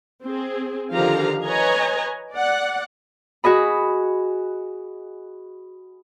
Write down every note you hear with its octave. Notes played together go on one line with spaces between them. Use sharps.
C4 G#4
D3 D#3 F3 G4 F5 A#5
B4 C#5 D#5 G#5 A#5
D5 F#5
F#4 G#4 D#5 B5